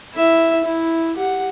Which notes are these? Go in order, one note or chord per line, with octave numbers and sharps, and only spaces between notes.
E4 E5
E4
G4 F#5